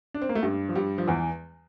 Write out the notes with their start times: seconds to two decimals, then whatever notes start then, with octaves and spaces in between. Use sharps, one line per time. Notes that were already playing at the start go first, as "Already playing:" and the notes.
0.14 D4
0.22 C4
0.29 A#3
0.35 A3
0.43 G2 G3
0.69 F3
0.75 G2 G3
0.98 F3
1.08 E2 E3